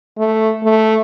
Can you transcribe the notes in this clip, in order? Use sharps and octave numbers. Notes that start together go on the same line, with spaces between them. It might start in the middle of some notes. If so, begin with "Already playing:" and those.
A3
A3